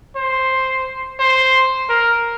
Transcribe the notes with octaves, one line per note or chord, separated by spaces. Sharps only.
C5
C5
A#4